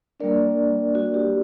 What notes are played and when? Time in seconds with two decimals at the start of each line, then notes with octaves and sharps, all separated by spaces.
0.20 G3 A#3 D4 A#4 D5
0.95 F#4
1.14 G4